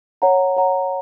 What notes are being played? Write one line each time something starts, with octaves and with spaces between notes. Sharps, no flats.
C#5 F#5 A#5
C#5 F#5 A#5